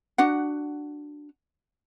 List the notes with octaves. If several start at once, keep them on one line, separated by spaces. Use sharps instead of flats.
D4 F#4 F#5